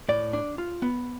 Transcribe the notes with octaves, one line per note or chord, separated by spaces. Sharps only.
A2 D5
D4
F4
B3